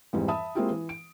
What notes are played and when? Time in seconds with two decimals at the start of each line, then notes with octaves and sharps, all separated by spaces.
0.13 F2 G#2 E3 G3
0.28 E5 A5 B5 D#6
0.55 G#3 A#3 C4 E4 F4 G4
0.71 E3
0.89 D7